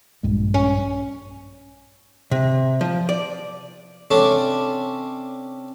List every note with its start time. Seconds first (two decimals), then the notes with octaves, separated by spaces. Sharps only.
0.23 A#1 G2 G#3
0.54 C#4
2.31 C3
2.81 F3
3.09 D5
4.11 C3 C#4 D4 A4